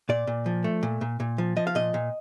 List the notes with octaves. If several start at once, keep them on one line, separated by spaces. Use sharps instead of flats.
A#2 D5
A#2
F3
A3
A#2
A#2
A#2
F3
F3 D#5
F5
A#2 D#5
A#2